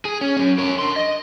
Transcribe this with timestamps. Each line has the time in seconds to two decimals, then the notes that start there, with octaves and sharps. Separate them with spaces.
0.05 G#4
0.21 C#4
0.37 F#3 C#4
0.58 A#4 C#5
0.79 D4 C6
0.96 D#5